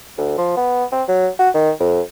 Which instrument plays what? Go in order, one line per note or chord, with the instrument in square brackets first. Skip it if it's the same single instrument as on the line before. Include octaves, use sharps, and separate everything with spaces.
[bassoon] D2
F3
B3
C4
F#3
F#4
D#3
F2